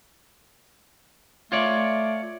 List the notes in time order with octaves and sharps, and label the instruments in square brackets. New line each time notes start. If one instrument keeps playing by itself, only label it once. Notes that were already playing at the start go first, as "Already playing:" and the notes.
[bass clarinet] A3 [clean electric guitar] F4 C#5 D5